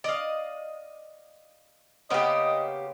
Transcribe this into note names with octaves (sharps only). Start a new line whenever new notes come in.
D5 D#5 F5
C#3 A#3 B3 G4 C5 D#5